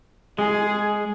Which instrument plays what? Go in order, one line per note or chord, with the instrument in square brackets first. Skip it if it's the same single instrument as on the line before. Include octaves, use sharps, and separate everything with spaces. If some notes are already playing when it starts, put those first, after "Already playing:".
[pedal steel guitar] G#3 [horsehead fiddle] G#4